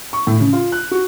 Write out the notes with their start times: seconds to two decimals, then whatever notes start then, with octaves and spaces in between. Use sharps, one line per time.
0.13 C#6
0.27 A2
0.40 C#3
0.53 F4
0.72 F#6
0.91 F#4